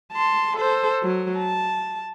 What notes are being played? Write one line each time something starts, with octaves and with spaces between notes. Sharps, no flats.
A5 C6
A4 C5
F#3
A5